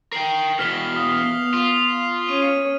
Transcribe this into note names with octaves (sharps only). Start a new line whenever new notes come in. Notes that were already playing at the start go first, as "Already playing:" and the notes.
A#4 G5 C7 F#7
E2 B2 F6 B6 G7
B3 F5 D#6
F4
C#4 C#5 D#7